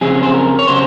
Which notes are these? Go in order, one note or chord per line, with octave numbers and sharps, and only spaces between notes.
F2 C#3 F#3 C4 G#4
C5
A#4
C#5
C#3 F#3 C4 C5